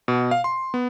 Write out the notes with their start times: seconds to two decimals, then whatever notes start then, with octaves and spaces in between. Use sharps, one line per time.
0.08 B2
0.31 F5
0.44 C6
0.74 B3